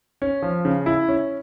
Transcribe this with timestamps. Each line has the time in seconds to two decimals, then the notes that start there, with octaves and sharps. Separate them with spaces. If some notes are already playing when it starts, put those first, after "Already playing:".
0.22 C#4
0.42 F3
0.65 C#3
0.86 E4
1.08 C#4